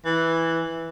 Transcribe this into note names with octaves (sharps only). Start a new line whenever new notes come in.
E3